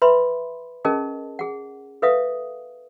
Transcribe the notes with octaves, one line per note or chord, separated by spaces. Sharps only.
B4 E5 B5 C6
C#4 G#4 A#4 D#5 A5
G#4 F#5
A4 B4 E5 F5 D#6